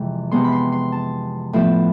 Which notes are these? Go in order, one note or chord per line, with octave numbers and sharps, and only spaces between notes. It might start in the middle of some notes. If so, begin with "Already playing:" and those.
Already playing: F2 C3 E3 G#3
C3 G#3 B3 C6
B5
C6
C6
A5
A2 F3 B3